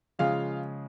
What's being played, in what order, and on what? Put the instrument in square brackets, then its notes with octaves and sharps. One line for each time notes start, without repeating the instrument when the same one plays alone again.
[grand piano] C#3 F3 G#3 F4 F5